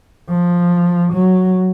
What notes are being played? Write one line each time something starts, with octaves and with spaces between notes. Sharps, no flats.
F3
F#3